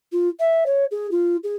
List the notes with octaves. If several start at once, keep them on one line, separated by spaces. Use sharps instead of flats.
F4
E5
C#5
G#4
F4
G#4